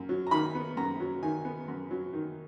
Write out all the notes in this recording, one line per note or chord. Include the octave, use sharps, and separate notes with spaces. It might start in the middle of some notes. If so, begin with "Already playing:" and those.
Already playing: F#2
F#3
A#5
D#3 B5
B3
F#2 A#5
F#3
D#3 G#5
B3
F#2
F#3
D#3